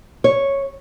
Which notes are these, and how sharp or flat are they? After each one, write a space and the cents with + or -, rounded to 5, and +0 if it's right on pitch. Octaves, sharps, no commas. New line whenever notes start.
C#5 -5